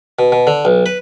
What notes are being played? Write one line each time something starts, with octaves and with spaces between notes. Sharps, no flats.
B2
B2
D3
B1
B4